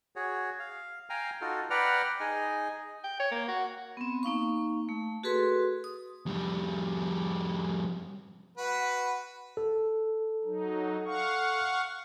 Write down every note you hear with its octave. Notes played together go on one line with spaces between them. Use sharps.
F#4 G#4 C#5
F5
F5 G5 G#5 A#5
D#4 F4 F#4 A4
B4 D5 F#5 G5 A#5 F6
D#4 G#4 D#5 G#5
G5
C#5
A#3
F#4
B3 C4
A#3 D#4 F5 C#6
A3
F#4 G#4 A4 B4 C6
D#6
F2 G3
F#4 B4
A4
F#3 D#4
F5 F#5 C#6